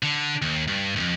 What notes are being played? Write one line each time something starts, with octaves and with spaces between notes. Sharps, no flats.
D3
D#2
G2
C2 F2